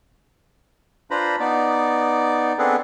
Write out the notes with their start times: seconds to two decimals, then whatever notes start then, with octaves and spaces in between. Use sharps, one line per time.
1.11 D4 F4 B4 C5 A#5 B5
1.40 B3 D#4 D5
2.59 B3 C4 D4 G#4 A4 B4